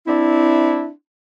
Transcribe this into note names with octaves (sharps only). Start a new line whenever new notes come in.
C4 D4 E4